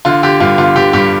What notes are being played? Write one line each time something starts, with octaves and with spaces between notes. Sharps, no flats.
D3 F4
D3 G4
G2 F4
D3 F4
D3 G4
G2 G4